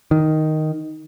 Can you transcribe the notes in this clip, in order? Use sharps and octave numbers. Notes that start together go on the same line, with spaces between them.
D#3